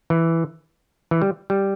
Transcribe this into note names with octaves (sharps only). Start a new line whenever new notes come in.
E3
E3
G3
G3